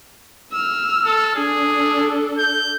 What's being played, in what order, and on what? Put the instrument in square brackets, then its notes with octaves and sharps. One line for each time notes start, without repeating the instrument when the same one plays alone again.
[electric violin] E6 F6
[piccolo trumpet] A4
[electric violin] D4 A4 [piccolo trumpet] G#4
[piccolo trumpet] G6